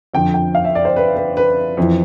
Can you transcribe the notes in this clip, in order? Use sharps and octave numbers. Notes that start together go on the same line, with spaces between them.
F2 D3 F3 G5
G5
F5
E5
D5
C5
B4
B4
B4
F2 E3